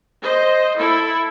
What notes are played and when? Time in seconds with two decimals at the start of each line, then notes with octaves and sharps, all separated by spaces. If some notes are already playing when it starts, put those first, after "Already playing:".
0.21 C5 D#5
0.77 E4 A4